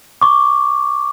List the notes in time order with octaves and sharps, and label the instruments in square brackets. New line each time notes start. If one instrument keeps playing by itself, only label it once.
[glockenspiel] C#6 D6